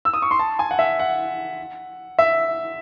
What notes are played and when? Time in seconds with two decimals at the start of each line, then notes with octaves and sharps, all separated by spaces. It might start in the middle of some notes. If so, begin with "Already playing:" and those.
0.05 E6
0.14 D#6
0.22 C#6
0.31 C6
0.39 A5
0.59 G#5
0.71 F#5
0.79 E5
1.00 F#5
2.19 E5